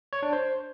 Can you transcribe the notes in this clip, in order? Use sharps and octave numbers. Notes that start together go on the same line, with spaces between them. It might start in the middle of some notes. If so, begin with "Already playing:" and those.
C#5
D4
C5